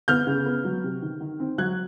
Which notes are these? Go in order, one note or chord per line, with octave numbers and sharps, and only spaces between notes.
B3 F6 G6
C#3
B3
F#3
C3
D#3
D#3
C4
F#3 F#6 G#6